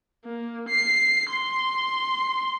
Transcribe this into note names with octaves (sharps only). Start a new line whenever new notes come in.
A#3
C7
C6